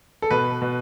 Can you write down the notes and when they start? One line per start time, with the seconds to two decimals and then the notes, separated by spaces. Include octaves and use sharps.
0.22 A4
0.31 B2 B4
0.62 B2